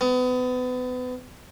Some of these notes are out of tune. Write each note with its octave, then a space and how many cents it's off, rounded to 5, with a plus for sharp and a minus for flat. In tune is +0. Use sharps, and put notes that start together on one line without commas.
B3 +30